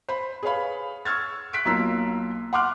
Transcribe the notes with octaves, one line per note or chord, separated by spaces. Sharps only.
C5 B5
G#4 B4 C#5 F5 B5
C#6 E6 F6 G#6 A6
F#6 B6 D7
B1 A#3 F4 A#5 E6 B6
F#5 C6 D6 F6 F#6